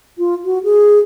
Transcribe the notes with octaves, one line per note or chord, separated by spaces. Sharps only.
F4
F#4
G#4